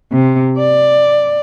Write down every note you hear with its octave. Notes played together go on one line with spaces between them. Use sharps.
C3
D5